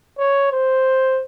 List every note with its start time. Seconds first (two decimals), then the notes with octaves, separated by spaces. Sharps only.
0.19 C#5
0.52 C5